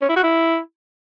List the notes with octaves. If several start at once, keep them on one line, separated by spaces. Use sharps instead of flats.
C#4
E4
F#4
E4